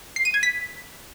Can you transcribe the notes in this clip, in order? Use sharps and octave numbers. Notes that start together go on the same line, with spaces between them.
C7
D#7
G#6
B6